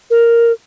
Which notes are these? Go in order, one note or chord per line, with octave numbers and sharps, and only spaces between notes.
A#4